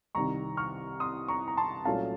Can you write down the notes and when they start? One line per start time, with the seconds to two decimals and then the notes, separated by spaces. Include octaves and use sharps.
0.15 C2 C3 D#3 A#5 C#6
0.57 C#6 F6
1.00 C6 D#6
1.28 A#5 C#6
1.48 A#5
1.57 A5 C6
1.85 C2 A#2 F#3 A3 C#4 F5 A5